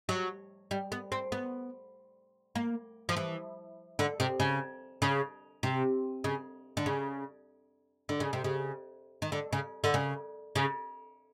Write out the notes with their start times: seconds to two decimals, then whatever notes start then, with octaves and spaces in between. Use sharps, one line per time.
0.09 F#3
0.71 G3
0.92 B3
1.12 C4
1.32 B3
2.55 A#3
3.09 F3
3.17 E3
3.99 D3
4.20 C3
4.40 C#3
5.02 C#3
5.63 C3
6.24 C#3
6.77 D3
6.86 C#3
8.09 D3
8.20 C#3
8.33 C3
8.44 C#3
9.22 D#3
9.32 D3
9.53 C#3
9.84 D3
9.94 C#3
10.55 C#3